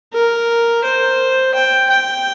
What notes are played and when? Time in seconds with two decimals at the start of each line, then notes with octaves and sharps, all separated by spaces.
0.13 A#4
0.84 C5
1.54 G5
1.90 G5